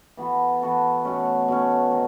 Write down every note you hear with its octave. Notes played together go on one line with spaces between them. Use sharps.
E3 B3 F#4 A4
E3 B3 F#4 A4
B2 A3 C#4
B2 A3 C#4
D#3